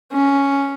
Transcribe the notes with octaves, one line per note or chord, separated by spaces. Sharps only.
C#4